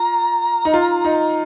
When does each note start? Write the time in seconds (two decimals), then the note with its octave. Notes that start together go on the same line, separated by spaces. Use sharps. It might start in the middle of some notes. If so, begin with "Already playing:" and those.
Already playing: F4 A#5
0.65 D#4
0.74 F4
1.05 D#4